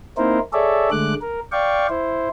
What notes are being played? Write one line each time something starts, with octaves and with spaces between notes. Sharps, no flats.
A#3 C4 D#4 E4 A#4 C5
G#4 A4 C#5 D5 E5
D3 G#3 A3 D6 F#6
A#4
D5 F5 G5 C#6
E4 C5